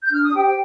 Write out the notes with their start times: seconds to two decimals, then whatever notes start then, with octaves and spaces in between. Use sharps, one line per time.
0.03 G6
0.12 D4 F6
0.23 D#6
0.34 G4 C5 G5
0.45 G5